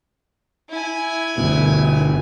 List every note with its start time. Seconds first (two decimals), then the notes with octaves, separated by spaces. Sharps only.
0.70 E4 G#5
1.38 G1 D2 B2